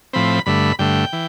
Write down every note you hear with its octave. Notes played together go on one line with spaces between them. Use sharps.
A2 F3 C4 B5
G2 D3 A3 B5
G2 D3 A3 G5
E3